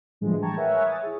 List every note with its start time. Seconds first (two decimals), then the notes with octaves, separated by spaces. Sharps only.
0.21 A2 D3 E3 F3 G3 G#3
0.42 G5 A5 A#5 C#6 G#6
0.56 A#4 B4 C#5 E5 F#5 G#5
0.86 D#6 A6
1.02 E4 G#4